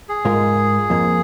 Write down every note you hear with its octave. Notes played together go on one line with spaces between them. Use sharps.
G#4
G#2 G#3 F4 A#4
F2 F3 A#3